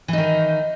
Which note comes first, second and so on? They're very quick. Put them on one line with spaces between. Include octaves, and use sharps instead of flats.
E3 D#4 D#3